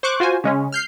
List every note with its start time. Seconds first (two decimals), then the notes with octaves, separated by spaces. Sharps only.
0.03 C5 C#6 D6 F#6
0.20 F4 F#4 C5 G#5
0.44 C#3 G#3 C#4
0.72 F6 G6 C7